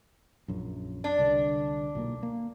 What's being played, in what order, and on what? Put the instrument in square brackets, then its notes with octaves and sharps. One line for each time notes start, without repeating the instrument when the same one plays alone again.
[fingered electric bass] A#1 F#2
[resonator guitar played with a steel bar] D4
[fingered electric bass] C2 D3
B1 A#2 A#3
A#3